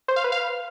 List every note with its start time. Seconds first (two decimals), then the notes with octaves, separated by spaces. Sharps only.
0.08 C5
0.16 F5
0.24 B4
0.32 F5